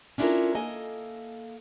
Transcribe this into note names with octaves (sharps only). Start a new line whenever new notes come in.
C#4 D4 E4 F4 A4 A#4
A#3 A4 D#5 G#5